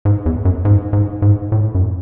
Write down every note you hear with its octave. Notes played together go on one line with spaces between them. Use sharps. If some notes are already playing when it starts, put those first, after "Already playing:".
G#2
E2
F#2
G#2
G#2
G#2
A2
F#2